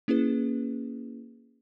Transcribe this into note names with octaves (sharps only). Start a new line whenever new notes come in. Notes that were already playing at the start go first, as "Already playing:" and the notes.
A#3 C#4 E4 G#4 B4